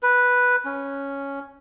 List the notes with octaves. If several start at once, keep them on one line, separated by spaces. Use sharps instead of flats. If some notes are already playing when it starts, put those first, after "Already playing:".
B4
C#4